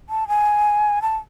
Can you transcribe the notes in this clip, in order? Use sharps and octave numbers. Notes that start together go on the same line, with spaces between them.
A5
G#5
A5